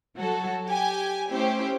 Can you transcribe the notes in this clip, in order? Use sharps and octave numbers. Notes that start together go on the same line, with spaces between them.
F#3 F#4 A4
G4 G#5
A3 C#4 E4 G4 C5